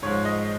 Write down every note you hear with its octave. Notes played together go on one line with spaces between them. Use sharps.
G#2 F3 G#3 C#5
D#5